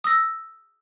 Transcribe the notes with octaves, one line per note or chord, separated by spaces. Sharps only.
D#6 E6 A#6